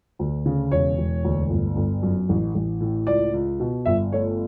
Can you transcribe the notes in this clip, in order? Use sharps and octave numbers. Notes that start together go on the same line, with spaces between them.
D2
C#3
E1 C#5
E1
D2
G1
G1
F#2
A1
A1
A2
C#2 D5
C#2
B2
G1 E5
A3 C#5